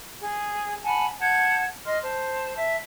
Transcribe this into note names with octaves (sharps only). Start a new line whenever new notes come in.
G#4
F#5 G#5 A5 B5
F#5 A5 G6 G#6
D#5 C6 F6
C5 A5
E5 A5